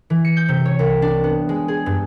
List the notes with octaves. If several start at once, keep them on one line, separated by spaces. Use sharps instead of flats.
E3
C#7
G6
C3
C#5
C2
D4
B3
G#3
G#4
G2